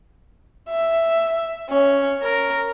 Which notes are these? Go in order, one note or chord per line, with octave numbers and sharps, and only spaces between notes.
E5
C#4
A#4